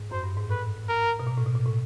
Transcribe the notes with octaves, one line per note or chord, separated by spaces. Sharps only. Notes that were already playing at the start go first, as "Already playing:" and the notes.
Already playing: G#2
F#2 C5
G2
G#2
A2 B4
A#4
B2
A#2
A2
B2
A#2
A2